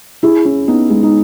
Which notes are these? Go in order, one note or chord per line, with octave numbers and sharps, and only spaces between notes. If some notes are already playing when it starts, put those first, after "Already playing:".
E4 G#4
C#4 E4
B3 D#4
G#3 B3
D#4